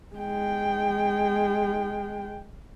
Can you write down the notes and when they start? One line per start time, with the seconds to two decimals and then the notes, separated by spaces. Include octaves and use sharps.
0.15 G#3 G5